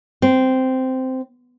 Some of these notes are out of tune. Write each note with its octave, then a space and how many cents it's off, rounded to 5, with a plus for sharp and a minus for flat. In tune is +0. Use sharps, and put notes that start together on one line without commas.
C4 -10